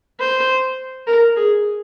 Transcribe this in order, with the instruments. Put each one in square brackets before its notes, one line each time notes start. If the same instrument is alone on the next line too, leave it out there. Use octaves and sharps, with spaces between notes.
[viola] C5
A#4
G#4